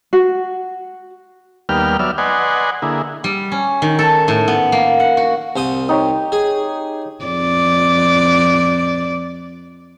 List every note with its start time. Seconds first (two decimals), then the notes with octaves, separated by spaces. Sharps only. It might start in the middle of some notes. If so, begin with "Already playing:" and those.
0.13 F#4
1.69 D#2 G3 A#3 B3 G5 F6
1.99 F#3 B3 D5 E5 F6
2.18 B4 D5 D#5 F#5 G#5 C6
2.82 D3 A#3 E4 G#4
3.24 G3
3.52 C#4
3.82 D#3
3.99 A4
4.28 A2
4.48 B3
4.72 A#3
5.00 F#5
5.17 F#4
5.56 C2 C5 D#6
5.89 D#4 G4 C#5
6.32 G#4
7.25 F2 D5